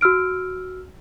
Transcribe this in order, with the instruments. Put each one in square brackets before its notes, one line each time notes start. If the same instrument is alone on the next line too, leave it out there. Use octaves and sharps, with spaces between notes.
[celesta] F#4 E6 F6 D7